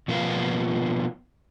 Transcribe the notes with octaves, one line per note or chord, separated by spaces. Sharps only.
B2 F3 A#3 B3 F4